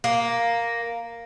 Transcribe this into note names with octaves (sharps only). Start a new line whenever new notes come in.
A#3